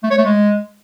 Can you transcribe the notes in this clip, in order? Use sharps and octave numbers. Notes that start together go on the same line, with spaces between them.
A3
C#5
A3
G#3